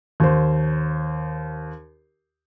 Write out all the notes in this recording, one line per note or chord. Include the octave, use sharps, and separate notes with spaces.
D#2 C5